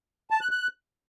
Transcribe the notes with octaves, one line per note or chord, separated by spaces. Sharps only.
A5
F#6
F#6